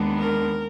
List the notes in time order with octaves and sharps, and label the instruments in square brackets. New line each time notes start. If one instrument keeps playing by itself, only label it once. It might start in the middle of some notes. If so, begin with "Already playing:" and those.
Already playing: [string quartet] D#2 D#3 G#3 B3 D4
A#4